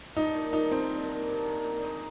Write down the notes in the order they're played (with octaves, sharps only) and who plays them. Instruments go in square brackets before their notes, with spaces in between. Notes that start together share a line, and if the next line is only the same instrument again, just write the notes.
[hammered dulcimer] G2 [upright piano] D#4
[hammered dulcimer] D#3 A#3
[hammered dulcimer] G2 [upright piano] D#4
[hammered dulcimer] D#3 A#3 [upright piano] C4
[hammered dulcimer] G2
D#3 A#3
G2
D#3 A#3
A#2
G#3 D#4